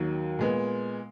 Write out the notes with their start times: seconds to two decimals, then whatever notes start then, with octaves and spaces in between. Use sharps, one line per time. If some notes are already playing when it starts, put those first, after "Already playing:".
Already playing: D#2 D#3 F#3
0.39 A#2 G#3 B3